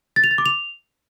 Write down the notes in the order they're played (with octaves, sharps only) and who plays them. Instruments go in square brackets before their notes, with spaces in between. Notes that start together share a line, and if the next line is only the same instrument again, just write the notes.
[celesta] A6
F7
A6
D6
F7